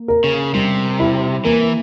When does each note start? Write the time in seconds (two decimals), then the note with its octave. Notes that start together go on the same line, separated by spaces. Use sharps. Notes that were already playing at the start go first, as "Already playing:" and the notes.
Already playing: A#3
0.08 A#4
0.24 C#3
0.54 C3 G3
0.99 E4
1.45 E3 A#3